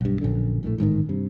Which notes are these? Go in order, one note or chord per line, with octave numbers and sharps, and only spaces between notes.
B1 G2
A#1 F#2 D3
A#1 A2 D3 A3
A1 G#2 C3 D#3
G2 C3